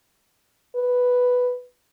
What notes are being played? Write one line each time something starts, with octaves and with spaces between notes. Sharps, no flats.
B4